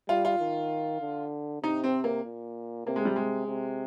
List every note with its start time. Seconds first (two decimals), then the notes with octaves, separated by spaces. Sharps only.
0.09 G3 F4
0.25 F4
0.40 D#3
1.01 D3
1.63 C3 D#4
1.84 C4
2.04 A#3
2.24 A#2
2.86 C3 A#3
2.96 G#3
3.05 G3
3.16 G#3
3.48 C3